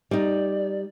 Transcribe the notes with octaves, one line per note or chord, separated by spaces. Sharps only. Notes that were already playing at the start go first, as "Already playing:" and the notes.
G3 D#4 D5